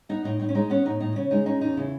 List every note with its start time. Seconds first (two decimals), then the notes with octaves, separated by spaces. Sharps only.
0.09 B3 D#4
0.24 A2 D#4
0.40 A2 D#4
0.49 C#4
0.55 G#3 D#4
0.70 B3 C#4
0.85 A2 D#4
1.00 A2 D#4
1.16 C#3 C#4
1.31 G#3 D#4
1.46 C#4 D#4
1.61 E2 D#4
1.77 C#3 E4